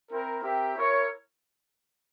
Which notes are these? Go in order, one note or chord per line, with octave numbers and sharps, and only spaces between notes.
C4 E4 A#4
C4 G4 A#4 E5 G5
E4 A#4 C#5